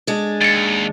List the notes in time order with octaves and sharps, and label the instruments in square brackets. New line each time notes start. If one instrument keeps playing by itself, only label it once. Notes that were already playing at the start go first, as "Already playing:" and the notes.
[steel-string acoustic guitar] G#3 D4
[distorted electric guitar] D#2 [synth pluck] A6 C#7